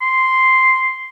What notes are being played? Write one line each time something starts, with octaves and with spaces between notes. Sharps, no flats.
C6